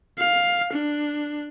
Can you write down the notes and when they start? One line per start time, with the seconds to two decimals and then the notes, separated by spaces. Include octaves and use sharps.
0.18 F5
0.73 D4